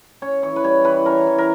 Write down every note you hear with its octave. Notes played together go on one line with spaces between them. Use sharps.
C#4 C#5
E3 C#5
B4
G3 C#5
E3 B4
C#4 A#4
E3
A#4